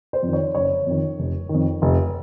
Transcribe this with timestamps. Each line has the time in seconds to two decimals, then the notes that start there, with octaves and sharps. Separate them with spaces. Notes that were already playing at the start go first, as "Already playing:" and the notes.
0.13 C5
0.23 F2
0.28 D#3
0.33 C#5
0.55 F#1 C#5
0.87 F2 D#3
1.19 F1
1.49 D#3
1.54 F2
1.82 F1